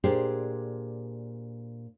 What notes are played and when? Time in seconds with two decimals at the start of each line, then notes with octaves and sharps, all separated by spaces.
0.04 A#2 D4 G4 G#4 C5